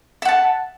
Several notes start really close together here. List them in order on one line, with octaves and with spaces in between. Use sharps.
E5 F#5 A5